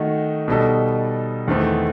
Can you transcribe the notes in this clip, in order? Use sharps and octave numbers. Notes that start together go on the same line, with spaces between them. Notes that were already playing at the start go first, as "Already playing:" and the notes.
Already playing: D#3 A3 D#4 F#4
B2 G3 D#4 A4
E2 D#3 A3 C4